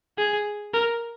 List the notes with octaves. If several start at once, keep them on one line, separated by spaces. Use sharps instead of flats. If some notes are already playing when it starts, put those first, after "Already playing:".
G#4
A#4